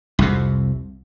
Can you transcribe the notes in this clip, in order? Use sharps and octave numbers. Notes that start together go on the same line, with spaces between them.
C2 F2 C3